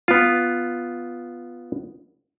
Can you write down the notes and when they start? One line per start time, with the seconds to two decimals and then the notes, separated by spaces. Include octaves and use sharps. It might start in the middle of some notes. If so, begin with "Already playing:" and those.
0.08 B3 F4